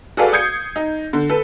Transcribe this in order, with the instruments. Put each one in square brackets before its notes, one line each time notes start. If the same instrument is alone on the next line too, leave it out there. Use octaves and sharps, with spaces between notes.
[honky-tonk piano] F#4 G#4 A4 B4 D5 F5
D#6 G6 G#6 C7 C#7
D#4
D3
A4 B4